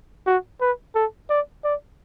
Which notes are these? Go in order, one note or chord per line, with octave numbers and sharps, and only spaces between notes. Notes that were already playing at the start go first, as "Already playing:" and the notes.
F#4
B4
A4
D5
D5